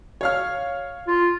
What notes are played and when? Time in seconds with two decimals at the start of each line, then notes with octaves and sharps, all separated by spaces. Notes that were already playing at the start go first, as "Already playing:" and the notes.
0.21 C#5 F5 F6
1.08 F4